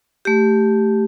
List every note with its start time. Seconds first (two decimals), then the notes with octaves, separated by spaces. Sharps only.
0.25 A3 G4